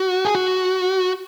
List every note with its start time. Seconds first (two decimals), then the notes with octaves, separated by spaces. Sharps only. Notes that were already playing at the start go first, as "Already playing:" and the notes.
Already playing: F#4
0.25 G#4
0.35 F#4